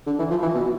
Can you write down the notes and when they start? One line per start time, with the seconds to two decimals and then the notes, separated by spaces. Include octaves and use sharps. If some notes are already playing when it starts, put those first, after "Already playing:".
0.06 D3
0.19 E3
0.30 F3
0.42 E3
0.55 B2